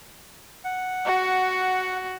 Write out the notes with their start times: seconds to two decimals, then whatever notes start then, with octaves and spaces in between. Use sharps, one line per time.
0.64 F#5
1.06 F#4